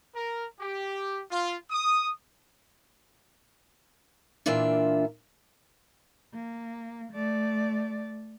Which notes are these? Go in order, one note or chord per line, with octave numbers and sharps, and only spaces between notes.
A#4
G4
F4
D#6
A#2 E3 A#3 D4 F4 E5
A#3
A3 D5